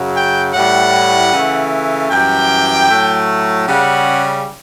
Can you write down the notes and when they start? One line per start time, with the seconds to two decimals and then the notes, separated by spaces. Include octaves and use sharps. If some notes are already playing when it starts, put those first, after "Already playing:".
Already playing: F#2 C#3 F#3
0.15 G5
0.54 A2 G3 F#5
1.32 C#3 E3 A3
2.11 F#2 E3 G3 G5
2.90 A2 F#3 A3
3.67 C#3 G3 F#5